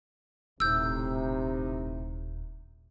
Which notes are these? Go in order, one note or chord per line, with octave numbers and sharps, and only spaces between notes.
D#1 A2 C3 D#4 E6 G6